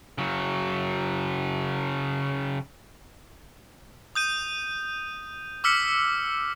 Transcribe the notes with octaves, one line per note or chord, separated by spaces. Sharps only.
C#3 F#3
D#6 G6 D#7
D6 E6 F6 B6 C#7